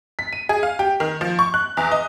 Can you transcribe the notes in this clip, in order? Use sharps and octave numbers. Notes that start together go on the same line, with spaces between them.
B6
D#7
G#4
F5
G4
D#3
F3
C#6
F#6
E2
D#5